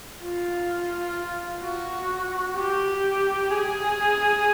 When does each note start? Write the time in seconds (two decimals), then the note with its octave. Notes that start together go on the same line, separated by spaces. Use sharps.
0.23 F4
1.63 F#4
2.57 G4
3.51 G#4